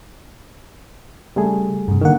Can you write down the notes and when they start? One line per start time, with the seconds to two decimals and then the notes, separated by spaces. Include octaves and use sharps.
1.36 C#3 G3 A3 G#4
1.88 G2 C3
2.01 D3 D#3 A#3 F#5